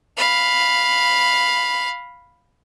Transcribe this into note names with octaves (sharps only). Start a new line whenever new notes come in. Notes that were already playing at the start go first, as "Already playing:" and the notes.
F5 B5